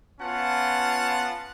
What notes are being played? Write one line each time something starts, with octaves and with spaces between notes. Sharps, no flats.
B3 C#4 F4 F#5 A5